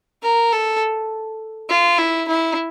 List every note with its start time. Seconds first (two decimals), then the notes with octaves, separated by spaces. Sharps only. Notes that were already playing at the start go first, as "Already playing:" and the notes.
0.23 A#4
0.52 A4
1.69 F4
1.98 E4
2.28 E4